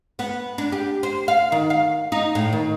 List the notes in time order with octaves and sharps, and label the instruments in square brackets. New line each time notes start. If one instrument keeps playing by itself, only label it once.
[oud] B3
D4
G4
C5
F5
D#3
F5
D#4
A2
D#3